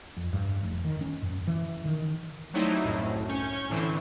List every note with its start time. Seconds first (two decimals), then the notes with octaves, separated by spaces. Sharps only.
0.17 F2
0.33 G2
0.63 F1
0.85 D#3
1.01 C#4
1.22 F#2
1.47 E3
1.85 D#3
2.53 F#3 G3 A3 C4 D#4 E4
2.84 C2 F#2 A2
3.29 C#4 C#6 G6
3.69 A2 D3 E3 C4